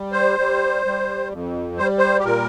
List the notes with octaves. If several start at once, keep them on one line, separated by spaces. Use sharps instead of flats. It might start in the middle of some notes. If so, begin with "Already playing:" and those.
Already playing: G3
C5
G3
G3
F2
G3 C5
C5
G4
A#2 A#4